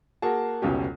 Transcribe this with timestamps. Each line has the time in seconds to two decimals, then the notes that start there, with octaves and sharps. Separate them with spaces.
0.22 A#3 F#4 G#4 A5
0.62 F1 C#2 B2 C#4 G4